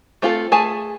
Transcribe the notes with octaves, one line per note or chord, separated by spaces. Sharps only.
A3 C4 F4 G#4 A4
A3 G#4 G#5 A5